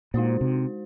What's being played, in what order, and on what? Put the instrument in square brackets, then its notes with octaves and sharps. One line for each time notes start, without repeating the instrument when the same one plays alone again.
[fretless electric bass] A#2 [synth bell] G#3 D#4 F#4 C5
[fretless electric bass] C3